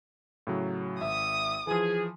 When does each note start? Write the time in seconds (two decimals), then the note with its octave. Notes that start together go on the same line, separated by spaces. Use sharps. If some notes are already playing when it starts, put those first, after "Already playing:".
0.47 A2 C#3 F#3
1.01 G#1 E5 D#6
1.67 E3 F3 G#4